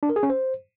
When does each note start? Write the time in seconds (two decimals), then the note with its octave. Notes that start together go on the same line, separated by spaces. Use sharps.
0.03 D4
0.09 A#4
0.16 G#4
0.23 C#4
0.30 C5